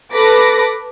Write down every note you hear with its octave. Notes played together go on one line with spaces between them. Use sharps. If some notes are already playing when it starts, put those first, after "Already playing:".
A4 B4 B5 D6 A#6